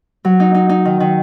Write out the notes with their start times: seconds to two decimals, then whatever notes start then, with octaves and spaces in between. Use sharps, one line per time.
0.25 F#3
0.40 D#4
0.54 D#4
0.69 D#4
0.85 D#3
1.00 D#3